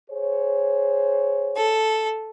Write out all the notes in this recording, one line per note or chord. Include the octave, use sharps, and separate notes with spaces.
G#4 C5 C#5
A4